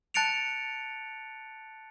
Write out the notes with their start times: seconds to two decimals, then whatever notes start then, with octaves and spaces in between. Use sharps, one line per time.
0.14 A5 F#6 A6 C#7 D7 F7